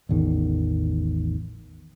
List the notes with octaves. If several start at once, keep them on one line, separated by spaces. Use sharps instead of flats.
A1 E2 D#3